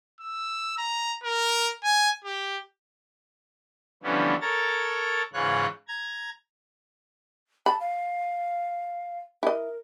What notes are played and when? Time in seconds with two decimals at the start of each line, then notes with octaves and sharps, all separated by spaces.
0.21 E6
0.78 A#5
1.23 A#4
1.84 G#5
2.25 G4
4.03 D3 E3 F3 G3 B3 C#4
4.41 A4 A#4 C#5 A#5 A6
5.33 G#2 C#3 E3 F4 C#5 F#6
5.88 A#5 G#6
7.66 A5 B5
7.80 F5
9.43 E4 A#4 D#5